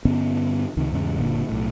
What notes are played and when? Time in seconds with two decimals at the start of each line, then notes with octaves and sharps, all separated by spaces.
0.05 G2 D3 B3 C#4
0.77 C#2 C3 D#3
0.92 E2 G#2 C#3
1.17 F#1 A#2 D3 A#3
1.49 B1 A2